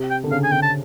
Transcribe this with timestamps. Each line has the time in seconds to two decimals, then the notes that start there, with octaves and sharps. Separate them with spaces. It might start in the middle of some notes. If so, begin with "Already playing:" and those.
Already playing: C3
0.11 G5
0.24 D3
0.31 C#3 F5
0.44 G#5
0.51 D3 G5
0.62 A5